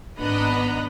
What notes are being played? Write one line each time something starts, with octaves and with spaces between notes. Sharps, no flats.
G#1 B3 D4 D#5 A#5 B5